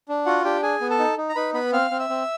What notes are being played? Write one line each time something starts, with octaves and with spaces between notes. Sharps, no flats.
D4
F4 F#4 F#5
D4 G4 G5
G#4 G#5
B3
A4 A5
D#4
D#4
A#5
D#4 B4 B5
B3 B4 B5
C4 F5 F6
C4
E5 E6
C4